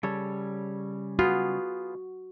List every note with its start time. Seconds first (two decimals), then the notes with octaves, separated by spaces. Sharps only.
0.03 C#3 G3 A4 C#5
1.19 B3 F4 F#4 G#4